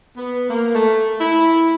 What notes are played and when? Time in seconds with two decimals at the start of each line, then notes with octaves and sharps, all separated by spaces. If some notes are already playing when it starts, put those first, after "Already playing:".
0.17 B3
0.49 A#3
0.75 A3
1.20 E4